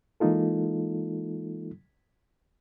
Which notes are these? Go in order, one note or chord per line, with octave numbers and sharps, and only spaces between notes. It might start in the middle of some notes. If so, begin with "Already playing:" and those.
E3 G#3 A#3 D#4 F4 A4